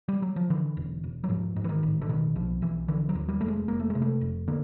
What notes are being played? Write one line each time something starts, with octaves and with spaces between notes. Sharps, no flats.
G3
F#3
F3
D3 E3
E1
E1
F#3
G#2 F3
G#2
E3
D#3
A1
D3
B2 D#3
B1 F3
B1 E3
D3 E3
F#3
D#2
G3
F1 A3
G#3
F1 A#3
A3
C3 G#3
A3
F1
D3 A#3